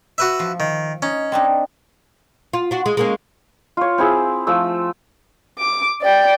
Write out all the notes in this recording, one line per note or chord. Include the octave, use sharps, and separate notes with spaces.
F#4 B4 E5
F3
D#3
C#4 D#4
C4 D4 D#4
F4
D4 F#4
G#3
G#3 A#3 C#4
F4 C#5
C4 E4 G#4
F3 A3 E6
D6
D5 G5